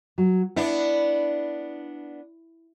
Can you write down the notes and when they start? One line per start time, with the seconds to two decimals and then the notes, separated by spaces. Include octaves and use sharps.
0.18 F#3
0.56 B3 D4 E4